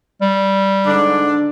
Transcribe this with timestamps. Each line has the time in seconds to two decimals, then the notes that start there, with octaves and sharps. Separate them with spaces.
0.21 G3
0.87 G#2 D3 D4